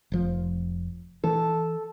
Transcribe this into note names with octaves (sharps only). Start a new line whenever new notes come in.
F1 F3
E3 A4